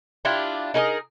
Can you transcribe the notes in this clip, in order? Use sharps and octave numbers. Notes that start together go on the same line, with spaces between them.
D4 E4 F4 G4
D#4 G#4 A#4 D#5